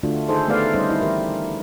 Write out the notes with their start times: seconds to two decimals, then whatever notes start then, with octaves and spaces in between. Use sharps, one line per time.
0.03 D3 A3 D4 F4 F#4
0.29 D#3 D#4 G#4 A4 C5
0.48 A3 B3 G4 B4 D5 F5
0.74 G3 C#4 D#4 C5 D#5
0.89 D#4 E4
1.01 E3 G4 A#4